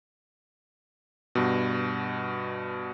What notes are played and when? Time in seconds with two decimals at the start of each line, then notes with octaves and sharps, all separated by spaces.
1.35 G2 B2